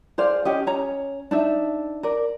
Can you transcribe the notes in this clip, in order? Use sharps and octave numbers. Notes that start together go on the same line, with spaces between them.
G#4 C5 D5 F5
C#4 G4 D#5
C#4 C#5 A#5
D4 D#4 E5
A#4 D5